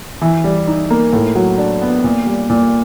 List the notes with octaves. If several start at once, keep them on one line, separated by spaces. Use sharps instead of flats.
E3
G3
D#4
A#3
A2
F#3
D4
B3
A#2
G3
A#2